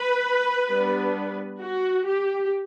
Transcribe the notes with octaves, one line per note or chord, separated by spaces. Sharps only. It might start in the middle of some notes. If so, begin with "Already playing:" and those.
Already playing: B4
G3 B3 D4
F#4
G4